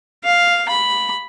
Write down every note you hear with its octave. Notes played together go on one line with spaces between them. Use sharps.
F5
B5